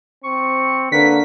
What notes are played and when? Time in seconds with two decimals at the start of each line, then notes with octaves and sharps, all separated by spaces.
0.24 C4 C#6
0.92 D3 A#3 B4 B6